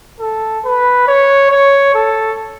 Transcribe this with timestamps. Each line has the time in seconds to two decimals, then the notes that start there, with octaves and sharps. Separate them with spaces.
0.20 A4
0.64 B4
1.07 C#5
1.51 C#5
1.95 A4